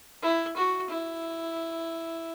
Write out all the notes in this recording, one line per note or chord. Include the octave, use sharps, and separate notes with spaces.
E4
F#4
E4